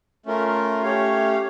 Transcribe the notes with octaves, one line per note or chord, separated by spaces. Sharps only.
A3 C#4 F4 A#4
A3 C#4 G4 C#5 F5